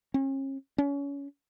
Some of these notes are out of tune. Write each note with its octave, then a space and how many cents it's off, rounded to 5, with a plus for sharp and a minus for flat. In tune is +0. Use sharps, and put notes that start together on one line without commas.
C#4 -40
C#4 +25